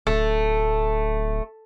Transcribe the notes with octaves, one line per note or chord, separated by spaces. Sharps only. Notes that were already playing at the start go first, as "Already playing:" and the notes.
D1 A3